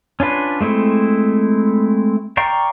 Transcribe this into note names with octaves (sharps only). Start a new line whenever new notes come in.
C#4 D4 F4 B4
G#3 A3 C4 E4
D5 F5 G5 A#5 C#6